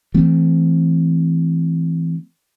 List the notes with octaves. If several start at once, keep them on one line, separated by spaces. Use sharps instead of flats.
E3 A3 C4